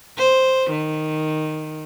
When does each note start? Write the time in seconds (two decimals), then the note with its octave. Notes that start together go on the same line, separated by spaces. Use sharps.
0.17 C5
0.71 D#3